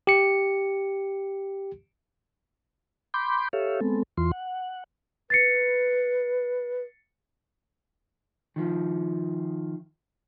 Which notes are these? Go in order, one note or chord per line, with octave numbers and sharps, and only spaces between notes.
G4 C#7
B5 C6 D6 G6
G4 A4 C#5 E5 F5
G#3 B3 C4 A4
E2 E3 F4 C6
F#5
B4 A6 C7 C#7
D#3 F3